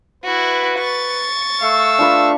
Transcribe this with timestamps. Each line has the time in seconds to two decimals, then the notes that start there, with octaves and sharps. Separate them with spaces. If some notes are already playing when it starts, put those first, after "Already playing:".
0.24 E4 F#4 B4
0.79 C#6 A6
1.61 A3 F5 E6
1.99 D4 F4 B4